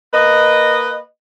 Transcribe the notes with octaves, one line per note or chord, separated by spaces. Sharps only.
A#3 B4 D#5